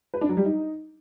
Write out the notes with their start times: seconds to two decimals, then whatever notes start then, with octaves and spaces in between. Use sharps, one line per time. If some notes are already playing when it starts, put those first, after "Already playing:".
0.14 B4
0.21 D4
0.29 F#3
0.37 G3
0.45 D#4